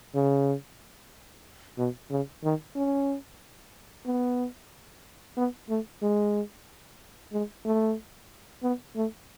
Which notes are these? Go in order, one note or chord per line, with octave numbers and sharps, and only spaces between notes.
C#3
B2
C#3
D#3
C#4
B3
B3
A3
G#3
G#3
A3
B3
A3